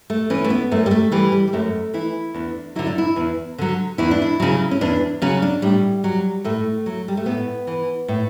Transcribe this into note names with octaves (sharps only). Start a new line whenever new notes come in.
A3
E3 C#4
A3
B3
F#2 A3
G3
A3
E3 G3
G3
G3
F#2 A3
E3 E4
E2 D4
D3 F#3 E4
D4
E4
E2
D3 F#3
E2 E4
D4
E4
C#3 F#3
C#4
E2 D4
C#3 F#3 C#4
D4
A2 G3
F#3
A2 A3
F#3
G3
A3
A2 B3
E3
A2